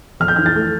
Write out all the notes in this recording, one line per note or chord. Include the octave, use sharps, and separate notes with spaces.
F2 F6
G6
E3 F6
A6
A3